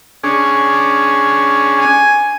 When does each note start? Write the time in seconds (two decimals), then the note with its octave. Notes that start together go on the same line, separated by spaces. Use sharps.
0.24 C#4 D4 G#4
1.79 G#5